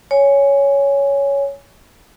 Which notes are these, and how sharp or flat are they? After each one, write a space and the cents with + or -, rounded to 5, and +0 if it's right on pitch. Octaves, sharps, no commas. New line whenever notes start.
C#5 +10 G#5 +0